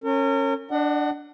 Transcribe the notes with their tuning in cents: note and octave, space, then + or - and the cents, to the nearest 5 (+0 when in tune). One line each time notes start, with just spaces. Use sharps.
C#4 -20 A#4 -40
D4 +0 D#5 -45 F#5 +15